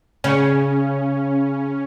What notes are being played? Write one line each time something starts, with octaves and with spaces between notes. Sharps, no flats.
C#3 C#4